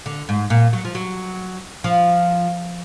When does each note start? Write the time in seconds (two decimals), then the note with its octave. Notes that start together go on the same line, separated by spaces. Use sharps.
0.06 D3
0.29 G#2
0.50 A#2
0.73 F#3
0.85 F3
0.95 F#3
1.84 F3